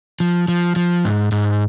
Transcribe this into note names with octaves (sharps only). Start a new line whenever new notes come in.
F3
F3
F3
G#2
G#2